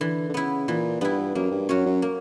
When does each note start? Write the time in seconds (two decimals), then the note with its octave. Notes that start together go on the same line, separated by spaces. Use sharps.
0.01 D3 E3
0.29 D3
0.34 C#3 B3 E4
0.68 A#2 E3
1.01 G2 B3 E4
1.35 F#2 A#3
1.52 G2
1.69 F#2 C#4 F#4
1.86 F#2
2.02 A#3